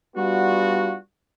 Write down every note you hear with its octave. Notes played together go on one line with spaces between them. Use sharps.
G3 B3 D4 F4 F#4